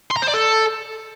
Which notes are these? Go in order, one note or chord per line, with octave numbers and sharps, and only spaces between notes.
C6
A#5
C5
D5
A4